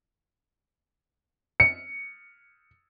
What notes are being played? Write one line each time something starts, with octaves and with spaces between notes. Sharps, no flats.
C#7